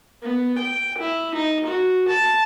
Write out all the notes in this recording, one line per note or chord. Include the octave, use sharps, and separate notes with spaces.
B3
G5
E4
D#4
F#4
A5